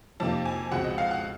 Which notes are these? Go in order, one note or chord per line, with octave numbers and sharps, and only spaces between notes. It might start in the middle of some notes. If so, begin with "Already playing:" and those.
F2 C3 F3 A#3 D#4 A5
G#5
C#2 B2 G#3 C4 F#5
D#5
F5
F#5